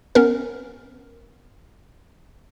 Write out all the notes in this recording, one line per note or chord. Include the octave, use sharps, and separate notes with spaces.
B3 C#4 A#4